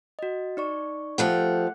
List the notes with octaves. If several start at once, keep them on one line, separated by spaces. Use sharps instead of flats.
F#4 D#5
D#4 D5 C#6
F3 A3 G4 F#5 F#6 C#7